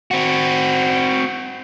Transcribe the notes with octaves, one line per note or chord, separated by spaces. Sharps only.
C4 F#4